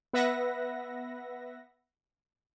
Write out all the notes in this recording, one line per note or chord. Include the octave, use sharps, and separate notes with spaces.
B3 B4 E5 F#5 A#6